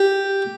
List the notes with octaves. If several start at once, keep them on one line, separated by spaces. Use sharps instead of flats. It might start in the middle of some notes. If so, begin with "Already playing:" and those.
Already playing: G4